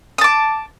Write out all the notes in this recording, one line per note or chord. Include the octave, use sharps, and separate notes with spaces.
A5 D6 D#6